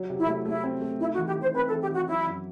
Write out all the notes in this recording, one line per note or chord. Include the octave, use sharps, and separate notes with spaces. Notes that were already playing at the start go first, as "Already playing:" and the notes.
Already playing: F#3
C3
E4
A3
A3 E4
C4
A3
D#4 E4
F#4
E3
G4
E3 C5
C4 B4
A4
E3
G4
E3 F#4
F#3 E4
F#2